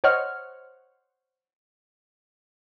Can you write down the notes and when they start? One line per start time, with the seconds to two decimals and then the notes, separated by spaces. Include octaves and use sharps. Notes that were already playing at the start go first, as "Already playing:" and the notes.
0.04 C5 C#5 D#5 F#5 F6